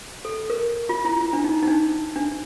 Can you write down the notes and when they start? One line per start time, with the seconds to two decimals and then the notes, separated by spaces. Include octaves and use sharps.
0.25 A4
0.50 A#4
0.89 F4
1.05 E4
1.21 E4
1.33 D4
1.44 D#4
1.63 D#4
1.67 D4
2.16 D4